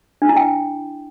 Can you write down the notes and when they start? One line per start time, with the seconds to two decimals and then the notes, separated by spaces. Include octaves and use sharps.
0.22 D4
0.29 E4
0.37 G5